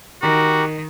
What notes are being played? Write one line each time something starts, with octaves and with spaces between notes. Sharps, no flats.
D#3 F#4 G4 A#4